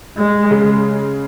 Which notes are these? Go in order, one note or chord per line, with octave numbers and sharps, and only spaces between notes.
G#3
C#3 G#3